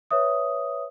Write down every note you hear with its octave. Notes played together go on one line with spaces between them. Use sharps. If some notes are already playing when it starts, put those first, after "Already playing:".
B4 C#5 E5 D#6